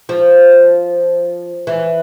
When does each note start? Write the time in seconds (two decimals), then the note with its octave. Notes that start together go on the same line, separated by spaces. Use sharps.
0.09 F3
1.67 E3